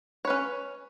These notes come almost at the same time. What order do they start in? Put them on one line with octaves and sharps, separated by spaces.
C#5 B4 C#4